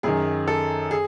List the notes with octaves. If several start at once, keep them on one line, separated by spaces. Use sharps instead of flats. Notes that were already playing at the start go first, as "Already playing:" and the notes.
F#2 D#3 G#4
A4
G#4